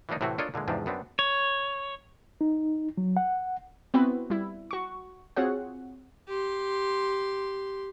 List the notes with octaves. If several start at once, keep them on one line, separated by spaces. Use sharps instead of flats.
E3 F#3 A#3 D4 D#4
A2 C3 E3 A3 C4 F#4
D4 F4 A4 A#4 C#5 D#5
A#2 D3 E3 G#3
E2 G#2 C3 F3 C4 D4
F#2 B3 C4 D4
C#5
D#4
F#3
F#5
B3 C4 E4 F#4 B4
G3 E4
F#4 C#6
C4 F4 F#4 G#4 C#5 F#5
G4 C6